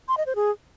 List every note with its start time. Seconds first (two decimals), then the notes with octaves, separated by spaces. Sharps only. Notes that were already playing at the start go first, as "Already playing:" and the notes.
0.08 C6
0.17 D#5
0.26 C5
0.36 G#4